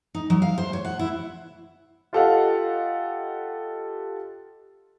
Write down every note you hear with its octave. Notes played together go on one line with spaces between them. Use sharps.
D#4
F#3
F5
C5
C#5
F#5
E4
F4 G4 A4 D#5 F5 F#5